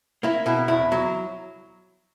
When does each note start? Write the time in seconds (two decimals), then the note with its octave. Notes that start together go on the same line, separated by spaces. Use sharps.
0.23 A#3 E4
0.46 B2 E4
0.68 E2 E4
0.92 F#3